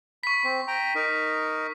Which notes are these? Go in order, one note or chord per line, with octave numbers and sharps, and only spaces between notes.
B5 C#6 B6
C4
G5 A#5
D#4 A#4